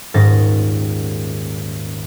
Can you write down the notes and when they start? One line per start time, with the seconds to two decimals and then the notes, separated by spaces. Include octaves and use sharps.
0.14 D#1 G#2 C#4 A6 A#6